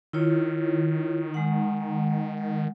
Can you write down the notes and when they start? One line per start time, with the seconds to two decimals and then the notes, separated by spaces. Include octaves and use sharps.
0.13 D#3 E4 F4 C#5
1.34 G#3 F#5